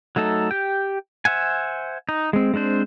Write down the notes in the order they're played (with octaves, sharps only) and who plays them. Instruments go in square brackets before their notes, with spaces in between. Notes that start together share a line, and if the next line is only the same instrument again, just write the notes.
[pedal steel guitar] F#3 A3 D#4 A4
G4 G5
C5 E5 F#5 G#5
D#4
G#3 C4
G#3 C4 D4 C5